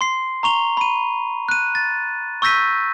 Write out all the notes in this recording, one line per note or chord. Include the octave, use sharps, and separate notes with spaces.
C6 C7
A#5 C#6 F7 G7
B5 D#7
F#6 D#7
A6
C#6 E6 G6 A#6 B6 D#7